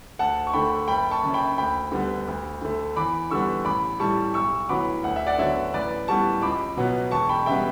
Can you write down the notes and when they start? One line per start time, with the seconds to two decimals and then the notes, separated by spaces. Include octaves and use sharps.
0.19 D2 F#5 A5
0.47 C#6
0.53 D3 A3 G5 B5
0.88 F#1 G5 B5
1.11 A5 C#6
1.24 F#2 C#3
1.34 G5 B5
1.58 D2 G5 B5
1.92 D3 G3 B3
2.27 D2
2.62 D3 A3
2.96 E2 B5 D6
3.31 D3 G3 B3 C#6 E6
3.65 A1 B5 D6
4.00 A2 G3 A5 C#6
4.34 B1 C#6 E6
4.69 A2 F#3 B3 B5 D6
5.04 D2 F#5
5.16 E5
5.27 D5 F#5
5.38 D3 F#3 B3 C#5 E5
5.74 A1 B4 D5
6.08 A2 G3 B3 A5 C#6
6.42 C#2 B5 D6
6.77 B2 F#3 B3
7.11 E1 A5 C#6
7.29 G5 B5
7.46 C#3 G3 B3 E5 G5